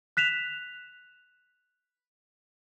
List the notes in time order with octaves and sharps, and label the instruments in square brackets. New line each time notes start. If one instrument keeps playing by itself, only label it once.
[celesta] F#6 B6 E7 F7